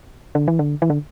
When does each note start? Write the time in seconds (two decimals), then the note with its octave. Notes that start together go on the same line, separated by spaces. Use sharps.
0.35 D3
0.48 E3
0.59 D3
0.82 E3
0.90 D3